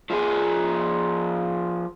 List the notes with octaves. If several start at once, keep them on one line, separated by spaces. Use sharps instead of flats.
F3 G#4